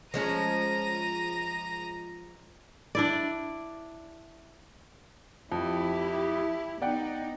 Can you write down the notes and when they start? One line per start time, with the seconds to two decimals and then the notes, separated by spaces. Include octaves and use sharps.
0.14 F3 G#3 C#4 A#5 D#7
2.95 D4 E4 D5
5.52 F2 E4 G4
6.82 B3 D#4 D5 F#5 G5